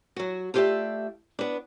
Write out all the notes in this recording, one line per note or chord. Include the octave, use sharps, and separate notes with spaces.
F#3 F#4
A3 F4 G4 C5 D5 E5
B3 D4